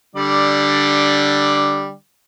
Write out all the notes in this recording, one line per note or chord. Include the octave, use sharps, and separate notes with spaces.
D3 G3 D5